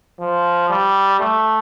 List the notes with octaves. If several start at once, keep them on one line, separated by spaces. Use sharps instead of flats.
F3
G3
A3